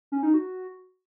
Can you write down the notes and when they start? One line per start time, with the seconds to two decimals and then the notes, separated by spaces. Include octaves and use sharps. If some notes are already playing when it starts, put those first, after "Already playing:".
0.12 C#4
0.23 D#4
0.34 F#4